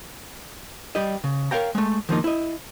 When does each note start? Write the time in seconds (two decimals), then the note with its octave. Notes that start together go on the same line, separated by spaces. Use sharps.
0.95 G3 G4 D#5
1.24 C#3
1.51 A#4 C#5 F5 G5 A#5
1.75 G#3 A3
2.09 D#3 F3 A#3 D#4
2.24 E4 D#5